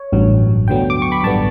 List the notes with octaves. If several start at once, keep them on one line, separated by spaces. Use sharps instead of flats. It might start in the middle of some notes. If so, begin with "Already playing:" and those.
Already playing: C#5
A1 G2 F#3
D2 D3 F#3 B3 G5
D6
C#6
B5
A1 G2 D3 G3 B3 A5